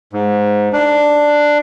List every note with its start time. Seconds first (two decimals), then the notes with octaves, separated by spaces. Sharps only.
0.13 G#2
0.73 D4